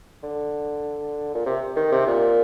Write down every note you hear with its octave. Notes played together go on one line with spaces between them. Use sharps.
D3
A#2
C3
D#3
C3
A#2